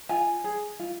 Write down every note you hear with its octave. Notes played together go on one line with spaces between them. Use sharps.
F4 G#5
G#4
F4